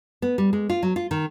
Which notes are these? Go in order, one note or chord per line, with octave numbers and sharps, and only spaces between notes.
B3
G3
G#3
F4
F#3
F4
D#3